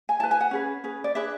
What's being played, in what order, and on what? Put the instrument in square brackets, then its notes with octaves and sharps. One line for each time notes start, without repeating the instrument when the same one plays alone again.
[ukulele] G#5
E4 A5
B4
G#5
F#5
C#4 G#4 B4
C#4 G#4 B4
D5
D4 G#4 B4 E5